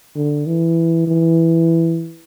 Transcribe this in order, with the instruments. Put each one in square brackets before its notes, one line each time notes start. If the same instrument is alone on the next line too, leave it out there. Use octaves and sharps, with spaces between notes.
[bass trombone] D3
E3
E3